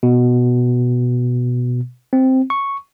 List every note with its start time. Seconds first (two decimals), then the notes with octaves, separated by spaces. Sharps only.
0.03 B2
2.13 C4
2.50 C#6